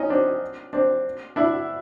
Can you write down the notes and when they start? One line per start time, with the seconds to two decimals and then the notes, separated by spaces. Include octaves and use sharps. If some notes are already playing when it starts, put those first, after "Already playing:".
Already playing: C#4 D#4
0.09 C4 D4
0.73 C4 D4
1.36 D4 E4